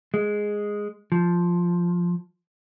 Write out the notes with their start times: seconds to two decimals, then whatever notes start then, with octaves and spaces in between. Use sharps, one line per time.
0.14 G#3
1.12 F3